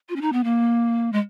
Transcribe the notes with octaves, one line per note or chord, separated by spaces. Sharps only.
F4
C#4
D#4
B3
A#3
G#3